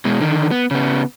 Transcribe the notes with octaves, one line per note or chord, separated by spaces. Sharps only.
B2 G#3
D3 D#3
B3
C#3 B3